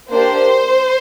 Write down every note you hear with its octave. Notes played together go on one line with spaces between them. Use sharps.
A#3 D4 G4 C5